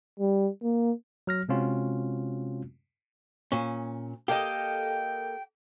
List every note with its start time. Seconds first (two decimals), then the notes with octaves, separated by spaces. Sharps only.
0.20 G3
0.63 A#3
1.27 F#3 F6 A#6
1.49 C3 G#3 C4 C#4 F4 F#4
3.52 A#2 C#4
4.28 A#3 G4 A4 D#5 G5